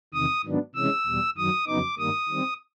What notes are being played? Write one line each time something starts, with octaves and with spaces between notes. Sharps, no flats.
E2 C3 D#3 D#6
G#2 D#3 F#3 B3 D4
C3 E3 G#3 C#4 E6
E2 B2 G3
F#2 D#3 F#3 D#6
F2 C#3 F#3 B3 D#4 D6
G2 D#3 G3 A#3 D#6
D#3 G3 C4